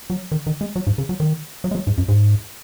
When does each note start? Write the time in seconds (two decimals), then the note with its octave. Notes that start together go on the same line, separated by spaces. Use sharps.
0.10 F#3
0.32 D#3
0.47 D#3
0.61 G#3
0.76 F#3
0.87 G#2
0.98 C#3
1.09 F#3
1.20 D#3
1.64 F#3
1.71 G#3
1.75 F#3
1.87 G#2
1.98 F#2
2.08 G#2